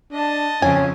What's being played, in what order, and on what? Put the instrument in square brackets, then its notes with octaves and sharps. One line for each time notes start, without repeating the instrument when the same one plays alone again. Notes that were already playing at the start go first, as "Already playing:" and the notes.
[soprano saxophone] D4 [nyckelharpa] D#5 A5
[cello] F2 C#3 [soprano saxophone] C#4 [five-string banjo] G#5